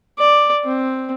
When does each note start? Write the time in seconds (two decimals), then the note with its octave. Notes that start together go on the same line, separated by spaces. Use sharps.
0.19 D5
0.65 C4